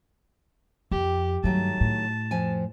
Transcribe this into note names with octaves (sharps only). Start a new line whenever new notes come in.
F2 G4
G2 D#3 F#3 A3 A5
A2
F2 F3 G#5